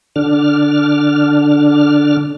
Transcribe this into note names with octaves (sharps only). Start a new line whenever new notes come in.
D3 D4 F6